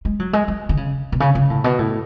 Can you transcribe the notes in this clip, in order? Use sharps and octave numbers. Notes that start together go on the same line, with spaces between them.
G#3
F#3
G#3
G#3
D3
C#3
B2
C#3
C#3
A2
B2
A2